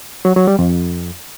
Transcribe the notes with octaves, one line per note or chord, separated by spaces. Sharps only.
F#3
F#3
G3
F2